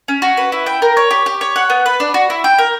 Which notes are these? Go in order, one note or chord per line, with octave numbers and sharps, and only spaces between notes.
C#4
F#4
B4
E4
G5
A#4
C#5
G4
G4
C#5
F#5
B3
B4
D4
F#4
E4
G5
A#4